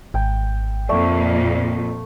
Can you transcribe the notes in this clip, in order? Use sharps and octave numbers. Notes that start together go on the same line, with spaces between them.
G#1 G5
F2 A#2 A3 D5